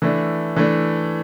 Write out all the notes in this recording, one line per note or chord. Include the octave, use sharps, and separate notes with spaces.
E3 A3 D4
E3 A3 D4